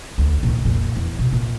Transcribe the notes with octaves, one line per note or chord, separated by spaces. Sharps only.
D2
A#2 D#3
F2 A#2
E2
B2
A#2